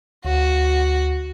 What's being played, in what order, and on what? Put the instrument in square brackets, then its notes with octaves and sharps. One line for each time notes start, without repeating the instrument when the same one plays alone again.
[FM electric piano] D2 [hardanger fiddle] F#4